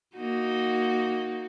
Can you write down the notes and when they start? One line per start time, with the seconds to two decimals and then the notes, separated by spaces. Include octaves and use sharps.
0.15 A#3 D#4 F#4